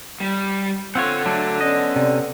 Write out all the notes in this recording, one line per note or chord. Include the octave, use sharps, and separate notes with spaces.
G3
C4 F4 A4 C#5 F#5
F#3 A3 D4
B3 C#4 D5 D#5
C3